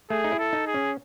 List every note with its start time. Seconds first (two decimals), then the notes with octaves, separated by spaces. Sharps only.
0.10 A3 G#4
0.24 D#4
0.32 E4
0.39 A4
0.53 D#4
0.67 G#4
0.74 C#4